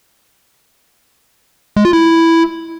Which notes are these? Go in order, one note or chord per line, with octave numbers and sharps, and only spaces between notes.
G#3
F4
E4